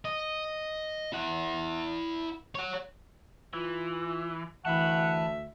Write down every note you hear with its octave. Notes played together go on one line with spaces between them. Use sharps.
D#5
E4 F#5
C#5 F#5
E3 F4
D2 E3 E5 F#5 A5 B5